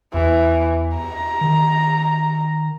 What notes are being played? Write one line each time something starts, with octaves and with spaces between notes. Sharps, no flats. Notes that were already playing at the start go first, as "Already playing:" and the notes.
E2 E3
A#5
D#3